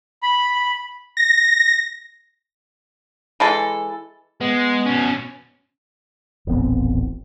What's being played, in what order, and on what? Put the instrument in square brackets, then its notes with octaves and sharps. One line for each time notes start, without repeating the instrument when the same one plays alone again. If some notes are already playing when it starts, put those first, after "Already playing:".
[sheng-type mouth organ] B5
[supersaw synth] A#6
[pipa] E3 G#3 A4
[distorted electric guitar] G#3 [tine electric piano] B3
[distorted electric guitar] B2 C#4
[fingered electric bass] D#1 A1 B3 C4